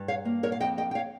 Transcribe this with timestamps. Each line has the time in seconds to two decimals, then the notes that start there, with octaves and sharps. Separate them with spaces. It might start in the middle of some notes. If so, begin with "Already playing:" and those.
Already playing: G2 G3
0.08 C#5 F5
0.25 A#3
0.43 A#4 C#5
0.52 F5
0.60 F2 D#5 G5
0.78 D#5 G5
0.91 G5
0.95 C#5 F5